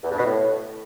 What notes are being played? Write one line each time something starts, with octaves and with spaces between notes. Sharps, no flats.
E2
G2
B2
A2